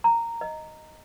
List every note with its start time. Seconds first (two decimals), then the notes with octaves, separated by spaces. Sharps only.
0.04 A#5
0.41 D#5